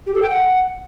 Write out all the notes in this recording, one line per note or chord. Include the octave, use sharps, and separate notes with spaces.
G4
A4
G5
F#5